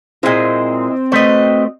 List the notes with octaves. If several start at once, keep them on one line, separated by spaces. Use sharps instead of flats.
A#2 G#3 C4 E4 C5 D#5
A3 F#4 B4 C5 D#5